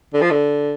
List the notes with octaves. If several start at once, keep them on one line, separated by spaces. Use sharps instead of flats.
D3
F3
D3